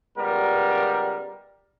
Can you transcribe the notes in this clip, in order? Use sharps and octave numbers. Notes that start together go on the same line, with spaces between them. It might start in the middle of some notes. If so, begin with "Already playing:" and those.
C#2 G3 B3 A#4